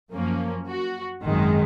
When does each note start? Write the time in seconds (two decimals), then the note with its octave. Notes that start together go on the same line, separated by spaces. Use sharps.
0.12 F#2 F3 A#3 C#4
0.69 F#4
1.24 G#1 F#2 D#3 G#3